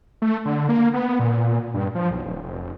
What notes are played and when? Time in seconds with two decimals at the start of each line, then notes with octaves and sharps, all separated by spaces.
0.22 A3
0.45 D3
0.69 A#3
0.94 B3
1.19 A#2
1.74 G2
1.95 F3
2.11 B1
2.25 D1
2.43 F1